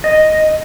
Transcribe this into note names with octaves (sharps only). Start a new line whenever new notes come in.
D#5